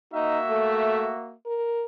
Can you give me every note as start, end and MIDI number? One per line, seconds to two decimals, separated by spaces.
0.13 1.35 58
0.13 0.38 63
0.13 1.35 66
0.13 1.35 76
0.50 1.10 57
1.46 1.86 70